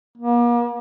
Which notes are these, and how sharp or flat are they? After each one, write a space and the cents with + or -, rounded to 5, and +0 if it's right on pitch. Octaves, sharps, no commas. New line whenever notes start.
A#3 +40